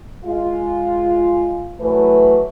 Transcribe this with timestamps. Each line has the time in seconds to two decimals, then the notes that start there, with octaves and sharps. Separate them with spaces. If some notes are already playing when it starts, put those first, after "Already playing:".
0.25 G#3 F4
1.80 E3 F#3 A3 B4